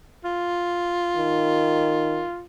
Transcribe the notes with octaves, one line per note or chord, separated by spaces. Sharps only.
F4
D#3